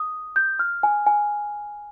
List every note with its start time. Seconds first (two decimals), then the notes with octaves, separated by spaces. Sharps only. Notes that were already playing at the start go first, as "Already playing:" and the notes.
Already playing: D#6
0.36 G6
0.59 F6
0.83 G#5
1.07 G#5